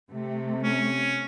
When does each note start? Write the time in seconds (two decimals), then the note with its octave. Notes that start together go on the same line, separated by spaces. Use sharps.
0.10 C3 A3
0.63 C#4